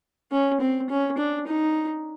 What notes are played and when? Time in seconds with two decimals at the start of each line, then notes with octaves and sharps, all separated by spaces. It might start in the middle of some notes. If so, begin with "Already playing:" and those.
0.32 C#4
0.61 C4
0.90 C#4
1.18 D4
1.47 D#4